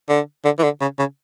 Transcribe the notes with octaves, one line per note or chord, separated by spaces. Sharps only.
D3
D3
E3
D3
C#3
C#3